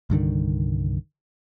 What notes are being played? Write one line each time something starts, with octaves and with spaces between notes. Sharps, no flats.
C2 G2 D3 D#3